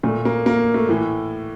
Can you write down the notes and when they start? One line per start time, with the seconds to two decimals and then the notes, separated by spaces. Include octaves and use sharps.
0.03 A#2 A3
0.25 A#3
0.46 A#3
0.74 A3
0.89 A2 E3